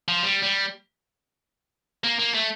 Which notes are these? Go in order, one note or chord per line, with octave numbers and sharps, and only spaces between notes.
F3
G3
G3
A#3
A#3
A3